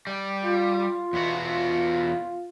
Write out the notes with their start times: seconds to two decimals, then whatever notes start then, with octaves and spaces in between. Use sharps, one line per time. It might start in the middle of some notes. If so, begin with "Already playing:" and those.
0.07 G3
0.43 F4
1.13 E2 B3 F#4